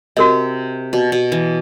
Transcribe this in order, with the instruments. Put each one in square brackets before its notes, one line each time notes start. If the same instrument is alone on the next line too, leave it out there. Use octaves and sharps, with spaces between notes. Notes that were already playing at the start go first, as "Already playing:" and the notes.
[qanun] C3 [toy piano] F#4 A#4 D#5
[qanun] B2
B2
E3